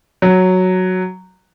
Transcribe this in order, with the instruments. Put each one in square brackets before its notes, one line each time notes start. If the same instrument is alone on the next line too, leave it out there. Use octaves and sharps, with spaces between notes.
[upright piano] F#3